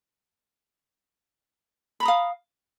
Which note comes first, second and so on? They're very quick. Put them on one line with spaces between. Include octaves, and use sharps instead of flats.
B5 A#5 D#6 F5